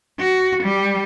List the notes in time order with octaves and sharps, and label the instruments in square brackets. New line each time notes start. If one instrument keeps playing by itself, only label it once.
[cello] F#4
G3